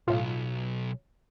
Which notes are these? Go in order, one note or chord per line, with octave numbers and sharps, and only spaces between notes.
B1 A2 F4